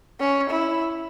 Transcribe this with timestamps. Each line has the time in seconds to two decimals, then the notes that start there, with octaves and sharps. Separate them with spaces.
0.20 C#4
0.50 E4